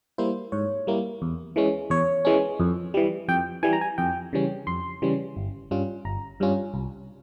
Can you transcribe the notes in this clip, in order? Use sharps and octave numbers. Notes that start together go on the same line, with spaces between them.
G3 A#3 E4 C5
G#2 C#5
G3 A#3 E4
E2
E3 G#3 C#4
E2 C#5
E3 G#3 C#4
F2
E3 G3
F2 G5
E3 G3 G#5
A#5
G#5
F2 G5
C#3 E3 G3 C#4
F2 C6
C#3 E3 G3 C#4
G1
G2 G3 C#4 F4
G1 A#5
G2 G3 C#4 F4
C2